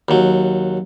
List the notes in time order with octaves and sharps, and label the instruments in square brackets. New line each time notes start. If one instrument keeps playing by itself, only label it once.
[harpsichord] D#2 F#3